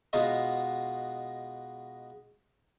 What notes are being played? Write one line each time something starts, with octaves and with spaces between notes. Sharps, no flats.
B2 G#3 D#4 F4 F#4 D#5